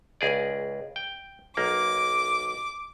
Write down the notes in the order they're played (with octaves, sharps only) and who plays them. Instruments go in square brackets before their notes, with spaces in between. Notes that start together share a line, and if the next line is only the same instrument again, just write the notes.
[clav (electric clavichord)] C#2 G#4 D5
G5
[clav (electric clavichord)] B1 A#3 [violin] D6